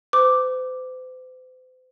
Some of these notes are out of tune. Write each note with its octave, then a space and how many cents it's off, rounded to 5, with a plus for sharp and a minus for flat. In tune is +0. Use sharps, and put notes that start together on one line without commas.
C5 -40 D6 +0